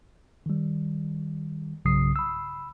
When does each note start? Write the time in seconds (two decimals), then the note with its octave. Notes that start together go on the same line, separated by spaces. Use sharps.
0.46 D#3 G3
1.85 B1 G2 C#3 F#3 D#6 C7
2.16 B5 E6